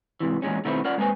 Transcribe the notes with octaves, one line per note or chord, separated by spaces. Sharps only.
G#2 C3 E3
E2 A#2 G#3 C#4
B2 D#3 A3 B3 C4 E4
C#4 F4 A#4 D5 F#5
G#3 A#3 C4 B4 G#5